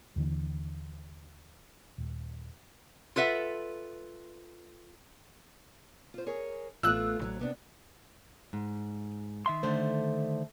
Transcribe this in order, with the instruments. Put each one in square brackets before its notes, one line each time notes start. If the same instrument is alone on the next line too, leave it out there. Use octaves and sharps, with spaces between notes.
[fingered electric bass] D#2 D3 E3
D#1
[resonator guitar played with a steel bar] F4 A4 B4 E5 F#5
[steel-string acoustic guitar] F4 C5
G#4 A#4 C#5
[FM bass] A1 [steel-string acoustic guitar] A3 B3 F4 [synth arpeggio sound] E6 F#6
[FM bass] A1 [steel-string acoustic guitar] D2 F3 F#3
[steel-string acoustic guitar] C3 B3 D4
G#2
[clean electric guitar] D#3 E5 C6
[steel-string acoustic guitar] D3 A3 C5